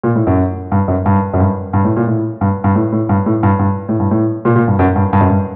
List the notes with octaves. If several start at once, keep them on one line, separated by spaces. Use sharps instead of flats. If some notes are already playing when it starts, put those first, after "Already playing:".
A#2
A2
F#2
G2
F#2
G2
F#2
G2
G2
A2
A#2
A2
G2
G2
A2
A2
G2
A2
G2
G2
A2
G2
A2
A#2
A#2
G2
F#2
G2
G2
F#2
G2